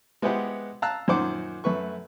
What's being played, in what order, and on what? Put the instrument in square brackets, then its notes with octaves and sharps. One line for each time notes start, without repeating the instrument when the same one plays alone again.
[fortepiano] G#3 B3 E4 G4 C5 F#5
F5 A5 A#5 E6 F#6
F#2 A#2 D#3 C5 F#5 D6
F#2 A3 B4 C#6